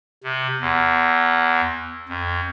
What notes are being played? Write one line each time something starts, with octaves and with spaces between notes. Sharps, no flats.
C3
E2
F2